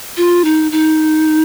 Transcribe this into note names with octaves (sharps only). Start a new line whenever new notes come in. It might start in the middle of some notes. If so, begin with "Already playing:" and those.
F4
D#4
D#4